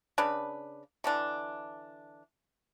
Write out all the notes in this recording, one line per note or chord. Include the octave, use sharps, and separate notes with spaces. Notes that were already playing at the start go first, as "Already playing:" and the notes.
C#3 D4 B4
D3 E3 D4